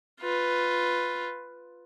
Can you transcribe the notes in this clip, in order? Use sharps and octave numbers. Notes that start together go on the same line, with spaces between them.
F4 B4